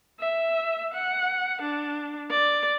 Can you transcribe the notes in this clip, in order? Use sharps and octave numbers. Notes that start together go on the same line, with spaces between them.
E5
F#5
D4
D5